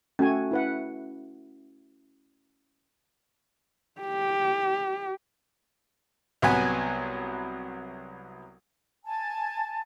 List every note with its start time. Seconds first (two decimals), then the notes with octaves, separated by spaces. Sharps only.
0.19 A3 C#4 F#4 G#5
0.51 E4 B4 F#5
4.01 G4
6.42 C2 F#3 B3 F#5 G#5 B5
9.06 G#5 A5